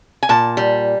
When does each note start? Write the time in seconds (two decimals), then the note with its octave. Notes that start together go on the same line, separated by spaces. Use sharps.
0.23 G#5
0.29 A#2 A5
0.57 G3